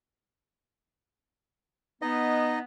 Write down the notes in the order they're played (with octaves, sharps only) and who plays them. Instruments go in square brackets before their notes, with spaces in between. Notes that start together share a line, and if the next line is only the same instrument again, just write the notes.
[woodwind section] B3 [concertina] D#4 D#5